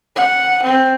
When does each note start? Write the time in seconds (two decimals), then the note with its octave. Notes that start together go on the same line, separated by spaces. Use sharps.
0.16 F#5
0.64 C4